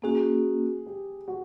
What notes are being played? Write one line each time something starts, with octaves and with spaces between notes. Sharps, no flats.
A#3 C#4 F#4 G#4
G4
F#4